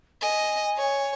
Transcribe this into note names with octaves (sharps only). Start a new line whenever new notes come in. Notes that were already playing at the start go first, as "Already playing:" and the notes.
D#5 G#5
C#5